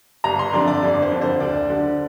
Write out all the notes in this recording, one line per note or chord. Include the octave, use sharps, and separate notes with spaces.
G1 A#5
C6
F2 D3 D5
D5
G1 D5
C5
F2 D3
C5
D2 D5
D3